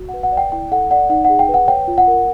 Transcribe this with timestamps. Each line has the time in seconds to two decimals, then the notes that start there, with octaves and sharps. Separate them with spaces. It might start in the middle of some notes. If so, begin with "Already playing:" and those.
Already playing: F#4
0.09 F#5
0.14 B4
0.23 F#5
0.32 D5
0.37 G5
0.52 E4 G5
0.72 A4 F#5
0.91 D5 F#5
1.10 D#4 F#5
1.25 G#4 F#5
1.39 G5
1.49 B4
1.54 F#5
1.68 C#5 G5
1.88 F4
1.98 F#5
2.07 A#4